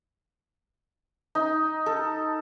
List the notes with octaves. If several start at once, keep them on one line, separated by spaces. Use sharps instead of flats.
D#4
A4